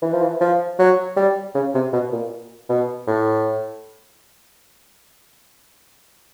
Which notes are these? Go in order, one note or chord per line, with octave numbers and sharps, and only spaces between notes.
E3
F3
E3
F3
F#3
G3
C#3
C3
B2
A#2
B2
A2